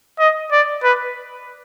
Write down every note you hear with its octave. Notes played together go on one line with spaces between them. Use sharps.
D#5
D5
B4